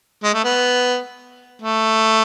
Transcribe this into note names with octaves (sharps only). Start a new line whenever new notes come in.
G#3
A3
B3
A3